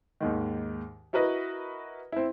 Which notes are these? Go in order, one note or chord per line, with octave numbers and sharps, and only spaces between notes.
D#2 G#2 D#3
E4 F#4 A#4 B4 D#5
C4 E4